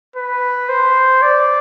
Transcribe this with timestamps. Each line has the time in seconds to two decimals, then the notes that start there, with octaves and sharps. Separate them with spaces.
0.16 B4
0.69 C5
1.22 D5